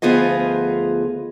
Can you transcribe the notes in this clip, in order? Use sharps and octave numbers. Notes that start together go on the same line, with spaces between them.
D2 F3 B3 F4 G#4 D#5